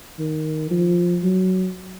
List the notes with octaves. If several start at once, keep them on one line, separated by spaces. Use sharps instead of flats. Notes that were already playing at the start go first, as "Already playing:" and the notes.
D#3
F3
F#3